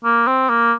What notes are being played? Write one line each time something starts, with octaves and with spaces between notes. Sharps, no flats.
A#3
C4
A#3